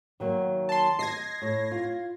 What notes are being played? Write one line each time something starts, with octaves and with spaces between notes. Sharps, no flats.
D#3 F#3 A#3
A5 C6
D#5 G#6 A#6 C7
A2
F4